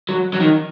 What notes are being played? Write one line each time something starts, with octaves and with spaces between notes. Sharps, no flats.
F#3
F#3
D#3